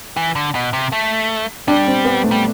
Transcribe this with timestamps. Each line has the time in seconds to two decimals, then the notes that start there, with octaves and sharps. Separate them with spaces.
0.17 E3
0.35 D3
0.55 B2
0.73 C3
0.92 A3
1.68 G3 D4
1.87 C4
2.05 B3
2.24 A3
2.32 G3